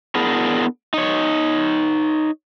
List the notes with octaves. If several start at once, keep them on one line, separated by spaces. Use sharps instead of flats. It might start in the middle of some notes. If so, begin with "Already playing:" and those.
B3 D4 E4 G#4 A#4
D#4 C#5